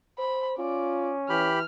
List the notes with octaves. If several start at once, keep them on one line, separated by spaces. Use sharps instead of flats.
C5 B5
C#4 F4 D5
E3 G4 B5 F6